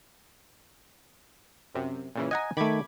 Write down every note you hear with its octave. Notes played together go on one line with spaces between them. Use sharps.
F#2 C3
A#2 C#3 E3
D#5 F#5 G#5 A#5
D#3 A3 B5 D6 G#6